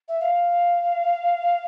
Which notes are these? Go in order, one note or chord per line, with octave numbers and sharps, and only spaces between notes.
E5
F5